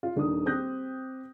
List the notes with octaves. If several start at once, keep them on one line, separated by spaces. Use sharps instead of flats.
F4
D#1 D#3 D4 D#6
C4 G4 D#6 F#6 G6 A#6